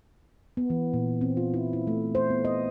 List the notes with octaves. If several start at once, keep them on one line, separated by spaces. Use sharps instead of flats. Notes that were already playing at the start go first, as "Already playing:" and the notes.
B3
E3
A#2
C4
F4
E4
E4
A3
C5
B3
D#5